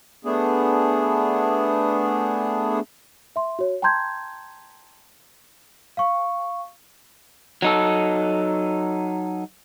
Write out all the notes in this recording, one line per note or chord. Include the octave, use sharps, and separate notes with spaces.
A3 B3 D4 G#4
E5 C6
F#4 C#5
G5 A5 A#5 C6 G6 G#6
F5 C#6
F#3 D#4 A4